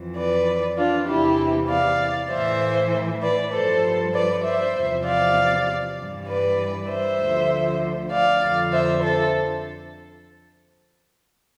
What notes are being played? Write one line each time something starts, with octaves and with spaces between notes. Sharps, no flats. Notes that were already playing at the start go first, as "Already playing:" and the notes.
Already playing: F2 E3
B4 D5
D4 F4
E2 C3 E3 E4 G4
D5 F5
A2 E3 C5 E5
B4 D5
G2 F3 A4 C5
B4 D5
C5 E5
E2 C3 F3
D5 F5
G2 E3
B4 D5
C5 E5
D2 D3 F3
D5 F5
F2 D3 F3
C5 E5
A4 C5